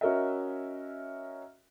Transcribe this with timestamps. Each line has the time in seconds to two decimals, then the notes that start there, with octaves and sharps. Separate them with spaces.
0.01 C#4 F#4 A#4 D#5 E5